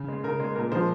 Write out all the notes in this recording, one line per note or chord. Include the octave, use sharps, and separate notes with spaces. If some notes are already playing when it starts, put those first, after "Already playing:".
Already playing: C#3
G#3
C#3 A#4
G#3
A#2 A#4
F3 G#3 C5